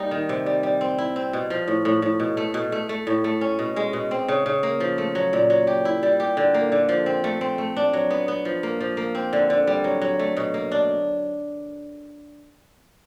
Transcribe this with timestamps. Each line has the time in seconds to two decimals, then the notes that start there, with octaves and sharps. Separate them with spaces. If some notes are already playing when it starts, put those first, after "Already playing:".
Already playing: G3 A#3 D#4
0.11 D#3
0.29 C3
0.46 G3
0.63 G3
0.81 C4
0.98 E4
1.16 C4
1.33 B2
1.50 F3
1.68 A2
1.85 A2
2.02 A2
2.20 B2
2.37 A3
2.54 B2
2.72 A3
2.89 A3
3.07 A2
3.24 A3
3.41 C#4
3.59 B2
3.76 G#3
3.93 B2
4.11 C4
4.28 C#3
4.46 C#3
4.63 A#3
4.80 F3
4.98 A3
5.15 F#3
5.33 A#2
5.50 F#3
5.67 G4
5.85 E4
6.03 G3
6.20 G4
6.37 D3
6.54 A#3
6.72 D3
6.89 F3
7.06 C4
7.24 A3
7.41 C4
7.58 A3
7.77 D4
7.93 F#3
8.10 B3
8.28 B3
8.45 F3
8.63 A#3
8.81 F3
8.97 A#3
9.15 C4
9.33 D3
9.50 D3
9.67 G3
9.84 F#3
10.02 F#3
10.19 A3
10.37 B2
10.54 A#3
10.72 D4